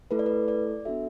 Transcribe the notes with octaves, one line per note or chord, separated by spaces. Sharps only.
A3 E4 A4 B4
D5
B4
D5
B3 D4 F#4 A4 E5